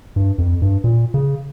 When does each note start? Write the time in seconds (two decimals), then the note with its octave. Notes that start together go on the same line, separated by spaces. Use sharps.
0.16 G2
0.38 F2
0.62 G2
0.84 A#2
1.14 C#3